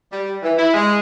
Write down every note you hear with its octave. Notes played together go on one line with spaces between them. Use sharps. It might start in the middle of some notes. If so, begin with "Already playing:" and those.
G3
E3
E4
G#3